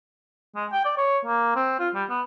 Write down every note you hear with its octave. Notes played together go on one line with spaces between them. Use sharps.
G#3
G5
D5
C#5
A#3
C4
F4
G3
B3